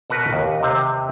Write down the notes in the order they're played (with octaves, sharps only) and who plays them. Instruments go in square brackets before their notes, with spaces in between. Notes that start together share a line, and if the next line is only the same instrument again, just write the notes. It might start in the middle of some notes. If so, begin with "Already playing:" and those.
[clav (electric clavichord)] B2 F#4 A#4 B4 D#5
D#2
C3 C4